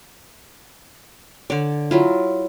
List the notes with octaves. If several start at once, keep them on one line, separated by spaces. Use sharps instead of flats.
D3 C#5 D5
F#3 E4 F4